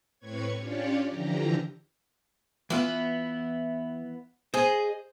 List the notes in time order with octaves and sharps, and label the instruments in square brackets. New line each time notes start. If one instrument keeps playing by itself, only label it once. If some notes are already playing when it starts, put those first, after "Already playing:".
[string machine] A2 C4 B4 C#5 C#6 G#6
C#4 D4 F4 G4 C#5 D5
D3 E3 F3 G4 A#5
[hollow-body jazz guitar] E3 F4 F5 [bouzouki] B3 E4
[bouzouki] G#4 D#5 [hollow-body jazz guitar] C5